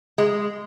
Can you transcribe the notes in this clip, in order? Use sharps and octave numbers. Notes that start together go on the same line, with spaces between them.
G#3